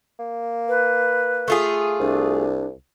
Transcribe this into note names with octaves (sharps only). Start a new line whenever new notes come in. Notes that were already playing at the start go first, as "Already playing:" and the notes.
A#3
B4
A3 F4 G#4
C2 D4